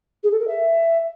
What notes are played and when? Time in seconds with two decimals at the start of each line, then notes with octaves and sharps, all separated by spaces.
0.23 G#4
0.32 A4
0.40 A#4
0.48 E5